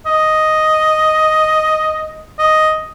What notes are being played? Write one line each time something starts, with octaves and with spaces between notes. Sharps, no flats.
D#5
D#5